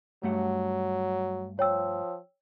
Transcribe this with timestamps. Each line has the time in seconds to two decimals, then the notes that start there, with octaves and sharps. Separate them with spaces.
0.23 G2 F#3 A3 F#5
1.59 F3 C#5 G5 E6